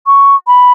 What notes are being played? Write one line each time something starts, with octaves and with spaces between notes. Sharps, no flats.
C#6
B5